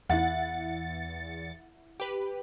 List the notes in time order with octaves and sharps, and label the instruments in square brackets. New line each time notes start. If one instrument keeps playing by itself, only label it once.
[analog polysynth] E2 A6 C#7 [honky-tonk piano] E4 F#5
[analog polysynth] G4 B4